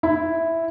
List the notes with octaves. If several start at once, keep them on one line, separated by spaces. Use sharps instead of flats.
E4